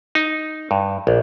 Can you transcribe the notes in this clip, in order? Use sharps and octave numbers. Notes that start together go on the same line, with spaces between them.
D#4
G2
A#1